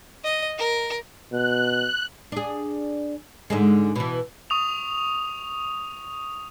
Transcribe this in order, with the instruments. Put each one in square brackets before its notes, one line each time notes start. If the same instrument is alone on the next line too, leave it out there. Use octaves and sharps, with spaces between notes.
[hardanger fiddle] D#5
A#4
[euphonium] B2 [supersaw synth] F#6
[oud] D4 G#4
G#2 D3 G#3
B2 E3
[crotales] C#6 D#6 F7